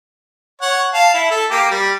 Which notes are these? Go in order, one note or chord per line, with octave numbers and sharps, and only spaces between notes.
C#5 F#5
F5 A5
E4
A4
A#3 G4
G3